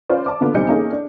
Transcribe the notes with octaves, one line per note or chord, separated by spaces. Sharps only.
C#4 F4 B4 C5 D5
D5 A5 D6
D3 A#3 B3 F4
B1 G3 C4 D#4 G6 C#7
A#3 C#4 D#4 G#4 A4
D4